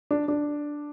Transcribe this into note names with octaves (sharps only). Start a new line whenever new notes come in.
D4
D4